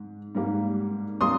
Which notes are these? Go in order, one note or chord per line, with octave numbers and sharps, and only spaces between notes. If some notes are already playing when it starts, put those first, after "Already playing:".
Already playing: G#2
G#2 G3 A#3
G3 A#3 C6 D#6